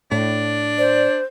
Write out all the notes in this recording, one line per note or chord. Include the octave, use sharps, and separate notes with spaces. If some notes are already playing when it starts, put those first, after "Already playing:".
A2 D4
C5 D5